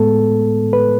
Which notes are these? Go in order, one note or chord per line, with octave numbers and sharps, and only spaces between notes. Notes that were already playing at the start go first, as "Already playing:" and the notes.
Already playing: A2 G#3 B3 A4
B4